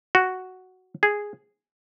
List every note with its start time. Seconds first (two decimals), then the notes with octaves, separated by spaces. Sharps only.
0.15 F#4
1.03 G#4